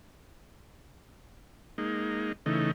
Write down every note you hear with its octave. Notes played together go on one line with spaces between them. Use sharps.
G#3 A#3 D#4
C#3 E3 A3 D#4